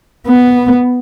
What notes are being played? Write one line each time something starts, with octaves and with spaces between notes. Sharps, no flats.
B3